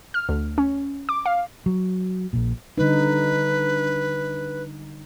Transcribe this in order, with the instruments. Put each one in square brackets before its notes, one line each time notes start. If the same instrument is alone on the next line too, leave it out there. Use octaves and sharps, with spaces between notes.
[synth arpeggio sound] F6
D2
C#4
D6
F5
[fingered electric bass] F#3
A#1 A#2
[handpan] D3 G3 D#4 [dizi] B4